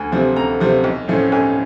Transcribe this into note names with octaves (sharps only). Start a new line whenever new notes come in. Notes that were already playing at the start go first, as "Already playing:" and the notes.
Already playing: D2 G#5
C3 F3 A3 C4
D2 A#5
C3 F3 A3 C4
B1
A2 F3 A3 C#4
B1 G#5